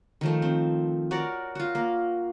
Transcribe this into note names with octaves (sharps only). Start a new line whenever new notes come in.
D#3 F3 A3
C4
F#4 A#4 C#5 D5
F4 F#4
A#3